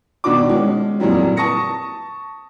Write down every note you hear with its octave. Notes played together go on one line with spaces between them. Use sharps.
B2 D#3 D4 F#4 D6
G#3 C#4
F2 A#2 E3 F#3 G3
A5 C#6 D#6 A#6 C#7